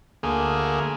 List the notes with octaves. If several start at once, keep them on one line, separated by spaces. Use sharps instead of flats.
D2 A3 A#3 G#4